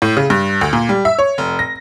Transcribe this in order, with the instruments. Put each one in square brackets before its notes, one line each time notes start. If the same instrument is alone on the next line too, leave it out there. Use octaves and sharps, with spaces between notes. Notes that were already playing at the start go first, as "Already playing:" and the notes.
[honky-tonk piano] A2
C#3
G2
D2
A#2
G3
E5
C#5
F1
A#6